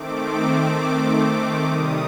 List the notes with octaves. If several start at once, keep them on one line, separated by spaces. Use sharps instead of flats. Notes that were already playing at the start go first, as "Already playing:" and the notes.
Already playing: D#3 A3 C4 D6
C3 D#3 G3 D#6